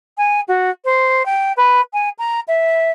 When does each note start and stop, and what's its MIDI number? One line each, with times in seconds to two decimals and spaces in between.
0.18 0.41 80
0.48 0.70 66
0.85 1.25 72
1.26 1.53 79
1.57 1.81 71
1.93 2.09 80
2.19 2.40 82
2.48 2.91 76